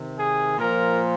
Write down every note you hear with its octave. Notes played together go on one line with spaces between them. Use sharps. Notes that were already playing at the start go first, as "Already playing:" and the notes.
Already playing: C3 D#3
G#4
A#2 F3 A#4